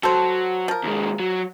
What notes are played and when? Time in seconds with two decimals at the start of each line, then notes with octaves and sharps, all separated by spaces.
0.03 F#3 A4 C5
0.68 F3 A#4
0.84 D#2 G#3
1.20 F#3